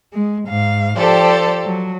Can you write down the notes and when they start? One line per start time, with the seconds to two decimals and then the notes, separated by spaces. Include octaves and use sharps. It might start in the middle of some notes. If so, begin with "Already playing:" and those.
0.12 G#3
0.47 G#2 F5
0.96 F3 G4 A4 C5 D5
1.63 F#3